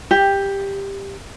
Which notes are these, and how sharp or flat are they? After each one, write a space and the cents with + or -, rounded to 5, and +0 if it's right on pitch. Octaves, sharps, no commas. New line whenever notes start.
G4 +10